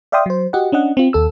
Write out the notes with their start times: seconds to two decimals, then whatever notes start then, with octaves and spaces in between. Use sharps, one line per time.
0.12 D5 E5 F5 G5 C6 D#6
0.26 F#3 C5
0.53 F#4 G4 D#5 F#5
0.72 C#4 D4 D#5 F#5
0.97 C4 F4
1.13 D#2 A4 E6